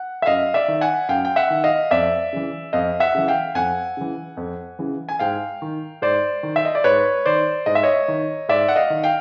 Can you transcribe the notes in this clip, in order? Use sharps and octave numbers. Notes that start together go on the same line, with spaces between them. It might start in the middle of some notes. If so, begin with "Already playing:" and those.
Already playing: F#5
E5
F#2 D#5 F5
D5 E5
D#3
F#5 G#5
F#2 F5 G5
G5
E5 F#5
D#3
D#5 F5
F2 D5 E5
C#3 E3
F2 D#5 F5
E5 F#5
C#3 E3
F5 G5
F2 F#5 G#5
C#3 E3
F2
C#3 E3
G#5
G#2 F5 G5
D#3
G#2 C5 D5
D#3
E5
D#5
D5
G#2 B4 C#5
D#3 C5 D5
G#2 D#5
E5
C#5 D#5
D#3
G#2 D5 E5
F#5
D#5 F5
D#3
F5 G5